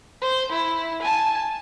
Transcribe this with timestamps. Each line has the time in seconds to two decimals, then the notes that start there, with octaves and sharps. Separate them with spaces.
0.22 C5
0.52 E4
1.02 G#5 A5